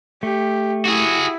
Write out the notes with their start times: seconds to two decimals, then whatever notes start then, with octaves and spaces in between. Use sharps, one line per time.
0.23 A3 G4
0.85 E4 F#4 G#4